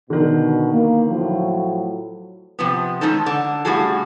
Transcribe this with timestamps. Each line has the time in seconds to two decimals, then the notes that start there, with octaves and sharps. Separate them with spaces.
0.10 B2 D3 D#3
0.71 A#3
1.07 A2 F3 F#3
2.59 C3 F3 B3
3.01 G#3 A3 C#4 D#4 A4
3.26 D3
3.65 A2 C#3 G3 F#4 G#4 A4